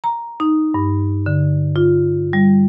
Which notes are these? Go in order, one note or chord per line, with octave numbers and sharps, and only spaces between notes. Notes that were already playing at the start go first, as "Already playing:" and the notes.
A#5
D#4
G2
D3
F4
G3